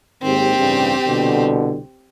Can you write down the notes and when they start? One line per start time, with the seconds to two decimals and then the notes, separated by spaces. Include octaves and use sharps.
0.22 G#1 D#2 C4 G4
0.59 A1 G2 C#3
1.06 C2 B2 D3